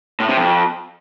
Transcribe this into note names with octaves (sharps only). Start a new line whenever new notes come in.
A2
C3
F2